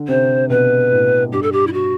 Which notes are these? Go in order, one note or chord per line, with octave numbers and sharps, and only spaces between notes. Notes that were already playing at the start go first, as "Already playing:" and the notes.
Already playing: D3
C3 C5
B2 B4
A2
G2 G4
A4
G4
E4
F#4